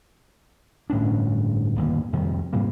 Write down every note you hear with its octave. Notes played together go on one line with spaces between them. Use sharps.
G1 A2 C#4 D4
G1 D#2 A#2
F2 C3 D#3 G3
G#2 C3 G3 A#3